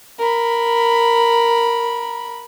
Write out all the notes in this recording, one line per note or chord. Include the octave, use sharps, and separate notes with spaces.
A#4 B5